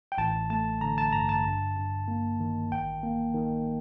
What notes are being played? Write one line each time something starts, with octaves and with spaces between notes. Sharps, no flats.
G5
A1 A5
A3 A5
D3 A#5
A5
G2 A#5
A5
G2
G2
A#3
D#3
A1 G5
A#3
D#3